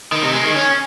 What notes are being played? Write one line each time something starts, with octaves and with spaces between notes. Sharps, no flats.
D#3
C3
G#3
D#3
C#4